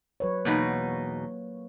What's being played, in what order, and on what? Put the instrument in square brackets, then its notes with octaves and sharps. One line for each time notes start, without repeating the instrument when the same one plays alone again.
[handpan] F#3 B4 C#5
[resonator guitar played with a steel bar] E2 B2 D#4 [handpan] A#3